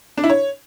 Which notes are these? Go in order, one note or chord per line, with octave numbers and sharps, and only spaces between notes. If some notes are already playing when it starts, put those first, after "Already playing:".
D4
E4
C#5